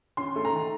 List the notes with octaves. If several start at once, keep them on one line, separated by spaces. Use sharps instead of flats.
C#4 C6
A3
A#5
D#3